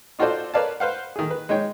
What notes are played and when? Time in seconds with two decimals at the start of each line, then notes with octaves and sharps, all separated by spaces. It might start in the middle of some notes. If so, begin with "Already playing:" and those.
0.19 D#4 F4 F#4 A4 C5 D5
0.54 A#4 B4 C#5 D5 F5 A5
0.80 B4 C5 F5 F#5
1.16 D#3 G#4
1.31 B4
1.49 G#3 D#4 C#5 G5